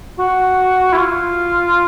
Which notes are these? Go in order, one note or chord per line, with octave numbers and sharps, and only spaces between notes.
F#4
E4
F4